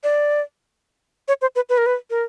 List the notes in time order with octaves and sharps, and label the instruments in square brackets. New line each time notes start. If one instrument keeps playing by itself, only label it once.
[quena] D5
C#5
C5
B4
B4
A#4
B4
A#4